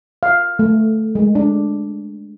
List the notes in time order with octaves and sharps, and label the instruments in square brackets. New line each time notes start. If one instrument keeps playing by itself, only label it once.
[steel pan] F5
A3
G#3
D4